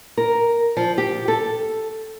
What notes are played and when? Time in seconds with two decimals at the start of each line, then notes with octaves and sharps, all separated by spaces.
0.18 A#4
0.77 F3
0.98 G4
1.28 A4